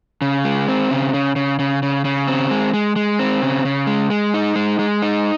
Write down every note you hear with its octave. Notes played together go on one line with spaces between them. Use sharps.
C#3
G#3
C4
C#3
C#3
C#3
C#3
C#3
C#3
C4
G#3
G#3
G#3
C4
C#3
C#3
G#3
G#3
D#4
G#3
G#3
D#4